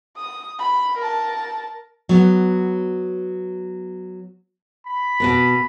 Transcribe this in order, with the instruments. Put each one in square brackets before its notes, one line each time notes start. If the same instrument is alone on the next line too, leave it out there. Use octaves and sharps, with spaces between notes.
[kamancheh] D#6
B5
A#4 A5
[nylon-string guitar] F#3 B3
[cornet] B5
[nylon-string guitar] B2 B3 A#4